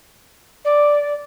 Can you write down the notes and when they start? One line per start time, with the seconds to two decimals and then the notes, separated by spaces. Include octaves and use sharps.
0.65 D5